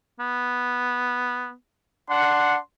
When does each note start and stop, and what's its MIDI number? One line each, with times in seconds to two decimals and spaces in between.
0.20 1.53 59
2.09 2.56 62
2.09 2.56 78
2.09 2.59 84